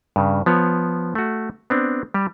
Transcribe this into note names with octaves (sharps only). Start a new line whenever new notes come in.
G2 C#3
F3 B3 C#5
A3 F#4
B3 C4 D4
G3 G4